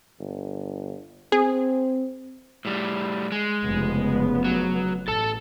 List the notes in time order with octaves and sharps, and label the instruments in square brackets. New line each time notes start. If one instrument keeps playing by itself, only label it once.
[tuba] G1
[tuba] C4 [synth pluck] G#4
[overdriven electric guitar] A2 G3
G#3
[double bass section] F1 C#3 B3
[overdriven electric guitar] F#3
[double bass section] A1 [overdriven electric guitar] A4 A5